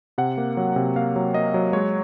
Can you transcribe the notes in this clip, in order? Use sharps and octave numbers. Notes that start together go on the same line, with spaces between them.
C3 F#5
A#3
F#3
C3
A#3 F5
F#3
A#3 D#5
F#3
G#3 C#5